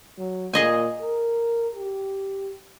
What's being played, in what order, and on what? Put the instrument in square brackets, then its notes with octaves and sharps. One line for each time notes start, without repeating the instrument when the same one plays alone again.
[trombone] F#3
[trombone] A#2 [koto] G#4 D#5 G#5
[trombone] A#4
G4